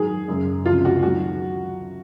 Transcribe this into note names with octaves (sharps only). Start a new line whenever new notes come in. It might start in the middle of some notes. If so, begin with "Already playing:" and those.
Already playing: G#2 D#3 F#3 G#4
F#2 C#3 F#3
C#2 C3 F3 F4
F#4
D#3 F#3 F#4